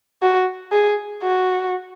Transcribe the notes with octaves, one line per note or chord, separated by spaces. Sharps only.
F#4
G#4
F#4